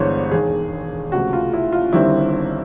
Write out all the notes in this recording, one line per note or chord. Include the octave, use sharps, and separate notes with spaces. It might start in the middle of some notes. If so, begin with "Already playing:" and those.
Already playing: G1 G2 E3 G#3 B3 C5 C#5
E1 D#2 D#3 G#4
C#2 C3 F3 A3 F#4
F4
E4
F4
G1 G2 D#3 G3 C4 E4